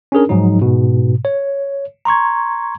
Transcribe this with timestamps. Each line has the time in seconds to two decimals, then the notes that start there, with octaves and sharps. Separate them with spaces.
0.12 C#4 D4 G#4 A#4
0.29 G#2 F3 F#3 D#4
0.61 G#2 B2
1.25 C#5
2.05 A#5 C6 C#6 G#6